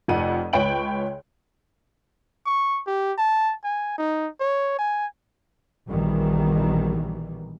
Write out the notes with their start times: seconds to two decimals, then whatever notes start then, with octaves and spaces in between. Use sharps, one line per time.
0.08 F1 F2 F#5 D#7
0.53 C#2 B4 C#5 G5 D7 F#7
2.46 C#6
2.87 G4
3.17 A5
3.64 G#5
3.98 D#4
4.40 C#5
4.79 G#5
5.89 A#1 B2 D#3 E3 G3